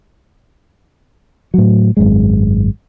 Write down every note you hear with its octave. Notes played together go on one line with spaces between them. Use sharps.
A2 F#3
G#1 F#2 G#3